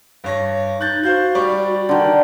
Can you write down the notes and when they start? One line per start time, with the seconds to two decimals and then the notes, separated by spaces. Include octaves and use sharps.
0.24 G2 C#5 A#6
0.81 D#4 F#6 G6 A6
1.03 F#4 C5 F5 G6
1.35 G3 D5 C#6
1.89 D3 D#3